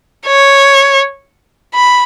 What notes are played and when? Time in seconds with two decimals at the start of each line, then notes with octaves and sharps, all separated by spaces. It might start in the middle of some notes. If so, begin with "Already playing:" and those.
0.27 C#5
1.75 B5